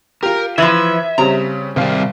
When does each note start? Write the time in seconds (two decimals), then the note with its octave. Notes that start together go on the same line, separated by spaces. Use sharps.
0.23 F4 G4 A#4
0.58 E3 F3 E5 G#6 D#7 F#7
1.18 C#3 G3 C4 A#5
1.76 G#1 C3 G3 F5